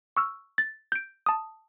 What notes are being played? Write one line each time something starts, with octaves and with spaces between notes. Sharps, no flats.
C#6 E6 F6
A6
G6 D7
A5 D#6